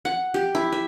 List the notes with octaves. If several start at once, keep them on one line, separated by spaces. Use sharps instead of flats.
F#5
G4
E4
E5